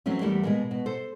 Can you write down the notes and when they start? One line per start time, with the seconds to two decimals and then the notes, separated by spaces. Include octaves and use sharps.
0.06 E3 F#3 A3 C4 C#4
0.21 E2 E3 G3 A3 A#3
0.43 B2 G#3 A#3
0.71 B2
0.86 A4 C5